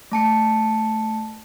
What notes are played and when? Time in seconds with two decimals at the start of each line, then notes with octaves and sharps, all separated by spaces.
0.12 A3 A5 C#7